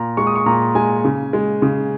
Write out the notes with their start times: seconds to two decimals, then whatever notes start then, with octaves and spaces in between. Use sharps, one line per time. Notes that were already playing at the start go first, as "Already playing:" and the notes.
Already playing: A#2 A#5
0.17 G#3 C#6
0.27 D#6
0.35 C#6
0.46 A#2 A#5
0.75 G#3 G#5
1.04 C#3
1.33 G#3
1.62 C#3